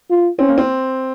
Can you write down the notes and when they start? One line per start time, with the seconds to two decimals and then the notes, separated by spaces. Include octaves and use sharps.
0.10 F4
0.39 C4 C#4
0.49 A#3
0.58 C4